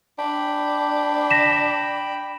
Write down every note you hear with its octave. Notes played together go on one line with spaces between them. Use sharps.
D4 G5 B5
A#6 B6 E7